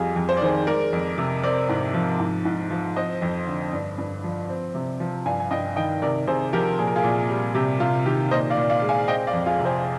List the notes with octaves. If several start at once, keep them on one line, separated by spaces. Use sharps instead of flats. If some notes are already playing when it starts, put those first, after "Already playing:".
Already playing: F2 G3 F4 G#4
F2
C5
D5
D#3 G#4 C5
G#3 A#4 D5
F2
C3
C4 A#4 D5
G#2
F3
G#2
G#2
F3
C4 C5 D#5
F2
D3
G2
G2
F3
C4
C3
F3
G2 F5 G#5
G#5
G2 D#5 G5
D#3 D#5 G5
C3 A#4 D5
C3 G#4 C5
F3 G4 A#4
A#2 G#4
A#4
F4 G#4
A#2
G3
C3 G4
C3 F4
D#3 G4
A#2 C5 D#5
D5 F5
A#2
D5 F5
G#3
F5 G#5
C4 D#5 G5
D5 F5
F2
F4 G#4
C3
G#4 C5